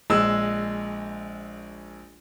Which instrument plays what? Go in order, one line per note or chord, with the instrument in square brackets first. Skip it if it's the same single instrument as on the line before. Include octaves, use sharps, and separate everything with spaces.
[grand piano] A#1 G#3 E6